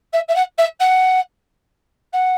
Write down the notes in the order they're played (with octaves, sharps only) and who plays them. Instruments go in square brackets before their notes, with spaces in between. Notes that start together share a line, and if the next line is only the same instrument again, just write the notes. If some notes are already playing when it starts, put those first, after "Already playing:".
[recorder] E5
E5
F#5
E5
F#5
F#5